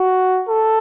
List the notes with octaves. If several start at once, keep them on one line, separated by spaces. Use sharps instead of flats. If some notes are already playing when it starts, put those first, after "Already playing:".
Already playing: F#4
A4